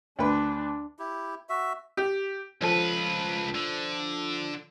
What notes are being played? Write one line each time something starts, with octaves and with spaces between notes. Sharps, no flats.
D2 D4 B4
E4 G4
F#4 E5
G4
C#2 F3 A4 B4
D3